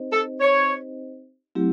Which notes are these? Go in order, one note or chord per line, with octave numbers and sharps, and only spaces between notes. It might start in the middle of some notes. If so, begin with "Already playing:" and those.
Already playing: C4 D#4 G4 C5 D#5
A4
C#5
F#3 A3 C4 E4 G4